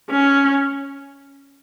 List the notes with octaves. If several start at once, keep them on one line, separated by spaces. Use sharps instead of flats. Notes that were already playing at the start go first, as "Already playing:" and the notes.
C#4